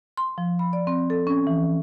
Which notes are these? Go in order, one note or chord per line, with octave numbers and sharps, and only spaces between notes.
C6
F3
B5
D5
C4
A4
C#4
E3